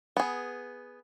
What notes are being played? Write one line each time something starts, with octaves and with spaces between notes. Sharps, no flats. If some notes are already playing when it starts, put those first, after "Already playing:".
B3 G#4